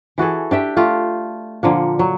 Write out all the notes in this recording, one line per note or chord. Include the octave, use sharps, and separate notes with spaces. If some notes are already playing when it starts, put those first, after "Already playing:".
E3 F#4 G#4 A4
D4 G4 E5 G5
A3 F4 G4
A#2 D3 F3 A#3
F#3